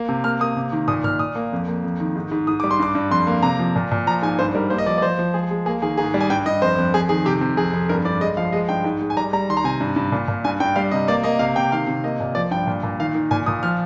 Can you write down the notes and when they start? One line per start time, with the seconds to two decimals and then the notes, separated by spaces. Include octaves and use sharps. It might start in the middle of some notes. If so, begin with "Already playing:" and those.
Already playing: A#3
0.09 C3
0.24 A#3 F6
0.40 A#3 D#6
0.57 C3
0.72 D#3
0.88 A#2 D#6
1.04 A#2 F6
1.19 A#2 D#6
1.35 A#3
1.52 F2
1.68 A#3
1.84 F2
2.00 D#3
2.15 G#2
2.31 G#2
2.47 G#2 D#6
2.60 G3 D6
2.71 C6
2.79 G2 D6
2.95 G2
3.11 F2 C6
3.27 A#3
3.43 C3 A#5
3.59 F3
3.76 A#2
3.92 A#2
4.07 F3 A#5
4.22 G#2 G#5
4.39 G2 C5
4.55 G3 A#4
4.70 A#3 C5
4.78 D#5
4.86 F3 D5
4.98 D5
5.02 F3 C5
5.19 F3
5.34 G#3 G#4
5.51 G#3
5.66 A#3 G#4
5.82 D#3 G#4
5.97 G#2 G#4
6.14 G3
6.21 G#5
6.30 G2 G5
6.46 G2 D#5
6.62 F2 C5
6.78 F2
6.94 F2 G#4
7.09 D#3 G#4
7.25 C3 G4
7.41 C3
7.57 F2 G#4
7.73 F2
7.89 G2 A#4
8.05 G2 D5
8.21 G#3 D#5
8.37 F3 F5
8.52 G#3 D#5
8.69 G2 G5
8.84 G#2
9.01 G#3
9.10 G#5
9.17 G3 A#5
9.33 G3 A#5
9.49 D#3 C6
9.57 A#5
9.64 C3 G#5
9.81 G2
9.96 G2
10.12 A#2
10.28 A#2
10.44 G2 G#5
10.60 G2 G5
10.76 G3 F5
10.91 C3 D#5
11.08 A#3 D5
11.24 A#3 D#5
11.39 C3 F5
11.56 C3 G5
11.72 D#3 F5
11.87 C3
12.04 A#3 D#5
12.20 A#2
12.35 F3 D5
12.51 G2 G5
12.67 A#2
12.83 A#2
13.00 D#3 F5
13.15 D#3
13.31 A#2 G#5
13.46 A#2 D#6
13.63 F3 F6